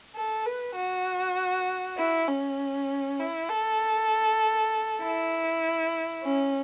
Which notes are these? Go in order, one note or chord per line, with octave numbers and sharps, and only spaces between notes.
A4
B4
F#4
E4
C#4
E4
A4
E4
C#4